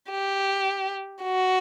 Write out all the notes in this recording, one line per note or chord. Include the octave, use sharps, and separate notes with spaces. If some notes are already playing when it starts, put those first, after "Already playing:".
G4
F#4